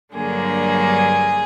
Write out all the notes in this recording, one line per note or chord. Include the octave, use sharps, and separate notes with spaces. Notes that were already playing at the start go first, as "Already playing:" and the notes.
G2 D3 F#3 A#3 D4 G#4